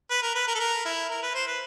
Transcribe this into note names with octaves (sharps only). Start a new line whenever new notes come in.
B4
A#4
B4
A#4
A4
A#4
E4
A#4
B4
C5
B4